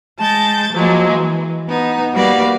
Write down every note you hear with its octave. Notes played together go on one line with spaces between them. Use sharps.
G#3 A5 G6 A6
F3 F#3 G#3 A#3
E3
B3 D#4
G3 A#3 F#4 B4 D5 F5